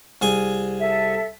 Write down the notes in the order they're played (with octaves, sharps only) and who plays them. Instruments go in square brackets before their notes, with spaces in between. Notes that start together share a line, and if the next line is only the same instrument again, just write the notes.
[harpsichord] C2 G#4 G#5
[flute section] A4 E5